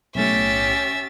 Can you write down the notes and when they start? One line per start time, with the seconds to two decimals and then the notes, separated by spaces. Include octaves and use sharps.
0.15 B1 A2 C#4 G4 E5 A6